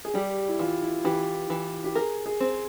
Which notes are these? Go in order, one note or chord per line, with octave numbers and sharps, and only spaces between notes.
G#4
G3 G4
E4
E3 F4
E4
E3 G4
E3
G4
G#4 A#4
G#4
C4